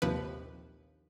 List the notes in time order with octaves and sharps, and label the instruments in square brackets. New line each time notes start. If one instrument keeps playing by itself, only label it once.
[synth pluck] A#1 D#2 C3 F3 B4